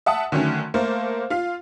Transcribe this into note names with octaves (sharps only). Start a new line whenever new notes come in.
E5 F#5 A5 D#6
D3 D#3 F#3 A3 C#4
A3 A#3 A#4 C5
F4 F5